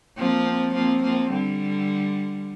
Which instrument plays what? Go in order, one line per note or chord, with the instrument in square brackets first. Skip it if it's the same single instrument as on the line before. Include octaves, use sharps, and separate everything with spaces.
[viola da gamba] F3 A#3 [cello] C4
[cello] C4
[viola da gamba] F3 A#3 [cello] C4
[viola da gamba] F3 A#3
D3 G3